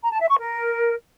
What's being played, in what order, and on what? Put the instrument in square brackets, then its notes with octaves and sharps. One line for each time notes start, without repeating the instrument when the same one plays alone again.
[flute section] A#5
A5
E5
C#6
A#4